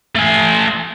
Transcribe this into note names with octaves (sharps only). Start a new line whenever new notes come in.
A3 G#5